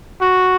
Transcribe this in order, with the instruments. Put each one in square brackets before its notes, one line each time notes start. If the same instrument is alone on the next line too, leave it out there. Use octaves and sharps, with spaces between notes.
[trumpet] F#4